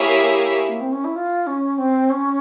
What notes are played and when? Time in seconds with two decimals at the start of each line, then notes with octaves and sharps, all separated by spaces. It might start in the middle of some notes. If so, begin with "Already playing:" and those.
Already playing: A#3 E4 G4 G#4 C#5 E5
0.69 A#3
0.81 C4
0.92 C#4
1.04 E4
1.16 F4
1.47 C#4
1.78 C4
2.10 C#4